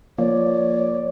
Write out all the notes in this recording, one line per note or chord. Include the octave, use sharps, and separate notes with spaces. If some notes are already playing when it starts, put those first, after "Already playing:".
F3 A#3 C#5 D5